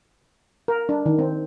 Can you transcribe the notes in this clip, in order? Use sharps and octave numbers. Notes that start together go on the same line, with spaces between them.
A#4
D4
D#3
C4